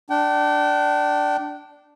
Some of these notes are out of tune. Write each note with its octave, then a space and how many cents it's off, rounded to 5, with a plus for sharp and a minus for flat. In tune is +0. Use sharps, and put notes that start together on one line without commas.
D4 +0 G5 -35